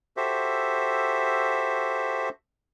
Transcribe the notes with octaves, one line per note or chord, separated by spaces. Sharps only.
F#4 G4 A4 C5 E5